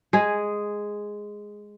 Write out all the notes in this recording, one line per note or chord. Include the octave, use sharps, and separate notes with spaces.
G#3 G#4